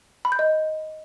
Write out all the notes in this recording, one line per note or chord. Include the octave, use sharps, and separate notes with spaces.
B5
G6
D#5